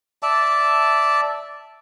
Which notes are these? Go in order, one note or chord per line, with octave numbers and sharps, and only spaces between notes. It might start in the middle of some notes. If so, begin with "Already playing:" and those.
D5 E5 A5